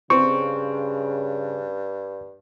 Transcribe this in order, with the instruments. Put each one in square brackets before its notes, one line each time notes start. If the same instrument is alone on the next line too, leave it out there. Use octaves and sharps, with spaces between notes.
[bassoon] G2 [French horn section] C#3 [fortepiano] C4 [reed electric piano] C#6